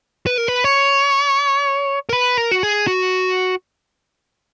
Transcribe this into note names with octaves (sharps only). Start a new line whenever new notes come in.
B4
A#4
B4
C#5
A#4
B4
A#4
F#4
G#4
F#4